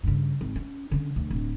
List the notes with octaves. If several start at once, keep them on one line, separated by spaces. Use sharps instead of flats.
G2 C#3
G#1
C#4
D3 C#4
D2 B2
D1